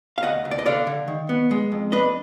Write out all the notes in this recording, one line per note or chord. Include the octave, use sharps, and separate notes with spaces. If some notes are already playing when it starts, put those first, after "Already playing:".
F5
D2 D#5 F#5
D2
D5
D#5
D3 D5 F5
D3
D#3
B3
G#3
F2
D4 B4 D#5